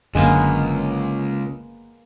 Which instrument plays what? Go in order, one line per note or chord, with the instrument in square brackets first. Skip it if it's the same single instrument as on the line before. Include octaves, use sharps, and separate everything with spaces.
[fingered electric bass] F#1 F#2 D3 [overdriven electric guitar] C#2 [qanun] G#3 A#3 B3